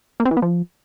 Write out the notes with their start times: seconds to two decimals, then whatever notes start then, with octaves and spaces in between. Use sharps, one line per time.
0.20 A#3
0.25 C4
0.31 E3
0.37 B3
0.42 F3